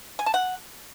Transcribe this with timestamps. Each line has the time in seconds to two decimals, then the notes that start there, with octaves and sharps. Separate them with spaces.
0.19 G#5
0.26 A5
0.34 F#5